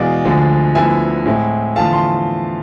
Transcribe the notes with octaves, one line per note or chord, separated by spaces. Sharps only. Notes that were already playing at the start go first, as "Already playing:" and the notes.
Already playing: E2 B2 G#3 D5 F5
D2 D3 F3 G#3
D2 D3 F3 B3 E4 E5 G#5
A2 G#3 C4 E4
E2 D3 F3 A3 F5 A5
A5 C6